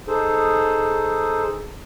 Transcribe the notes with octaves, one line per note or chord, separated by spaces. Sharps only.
D#4 G#4 A4 C5